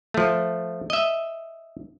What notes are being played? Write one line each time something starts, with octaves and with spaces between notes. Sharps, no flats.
F3 A3
D#5 E5